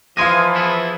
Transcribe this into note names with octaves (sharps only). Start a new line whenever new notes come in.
E3 F3 D#5 F5 G#5 C6 D#6
B3 E4 G#4